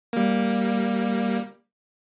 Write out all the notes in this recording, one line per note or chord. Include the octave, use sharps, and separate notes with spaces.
G3 A#3